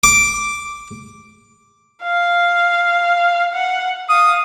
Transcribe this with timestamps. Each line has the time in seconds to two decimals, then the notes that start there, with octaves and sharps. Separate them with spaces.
0.04 D6
2.03 F5
3.54 F#5
4.09 F5 D#6